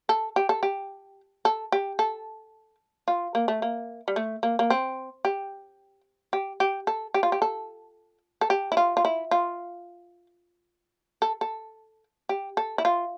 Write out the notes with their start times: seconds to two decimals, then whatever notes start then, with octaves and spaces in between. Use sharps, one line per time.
0.09 A4
0.36 G4
0.49 A4
0.63 G4
1.45 A4
1.72 G4
1.99 A4
3.08 F4
3.35 A#3
3.48 A3
3.62 A#3
4.08 G3
4.16 A3
4.43 A#3
4.59 A#3
4.70 C4
5.25 G4
6.33 G4
6.60 G4
6.87 A4
7.14 G4
7.23 F4
7.32 G4
7.42 A4
8.41 A4
8.50 G4
8.72 E4
8.77 F4
8.97 F4
9.05 E4
9.31 F4
11.22 A4
11.41 A4
12.29 G4
12.57 A4
12.78 E4
12.85 F4